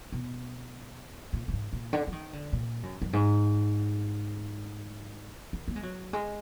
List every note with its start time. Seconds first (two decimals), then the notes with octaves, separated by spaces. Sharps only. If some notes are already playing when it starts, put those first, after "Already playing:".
0.12 B2
1.33 A#2
1.48 A#2
1.53 G#2
1.73 A#2
1.93 D3
2.07 F3
2.12 D#3
2.33 D3
2.53 A#2
2.83 F#2
3.02 F#2
3.13 G#2
5.53 D#3
5.68 A#3
5.76 G#3
5.83 F#3
6.13 G#3